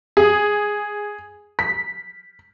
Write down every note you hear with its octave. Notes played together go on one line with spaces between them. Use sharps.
G#4
B6